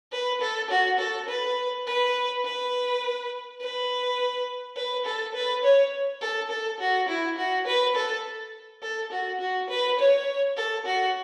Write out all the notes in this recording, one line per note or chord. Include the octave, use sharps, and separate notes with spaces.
B4
A4
F#4
A4
B4
B4
B4
B4
B4
A4
B4
C#5
A4
A4
F#4
E4
F#4
B4
A4
A4
F#4
F#4
B4
C#5
A4
F#4